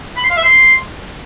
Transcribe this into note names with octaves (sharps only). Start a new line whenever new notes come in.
B5
C6
F5
E5
C6